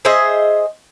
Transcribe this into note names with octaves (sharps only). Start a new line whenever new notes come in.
G#4 C5 D#5 E5